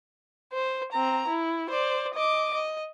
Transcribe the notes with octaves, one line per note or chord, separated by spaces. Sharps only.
C5
C4 A#5
E4
C5 D5
D#5 D6
D#5